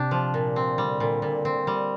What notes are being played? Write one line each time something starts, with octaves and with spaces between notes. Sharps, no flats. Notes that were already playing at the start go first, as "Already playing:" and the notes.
Already playing: C3 D4 G4
F3
A#2
C4
D3 G3
A#2
A#2
C4
G3